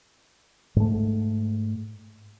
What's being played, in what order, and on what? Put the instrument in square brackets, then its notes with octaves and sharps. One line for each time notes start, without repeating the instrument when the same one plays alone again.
[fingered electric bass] G#2 A3